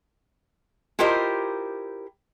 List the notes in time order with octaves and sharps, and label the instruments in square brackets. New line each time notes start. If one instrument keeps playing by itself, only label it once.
[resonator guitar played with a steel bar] E4 F4 G4 A#4 C5 D#5